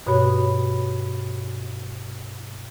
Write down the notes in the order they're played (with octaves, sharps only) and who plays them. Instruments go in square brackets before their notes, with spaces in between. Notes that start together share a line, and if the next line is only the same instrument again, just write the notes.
[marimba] G2 B2 F#4 C#5 B5